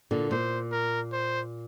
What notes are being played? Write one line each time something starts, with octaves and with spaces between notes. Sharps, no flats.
A#2 D3
A#2 C5
A#4
C5